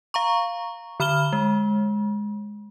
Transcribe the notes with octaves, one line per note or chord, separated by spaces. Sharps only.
F5 A#5 C#6
D3 B5 F6 E7 G7
G#3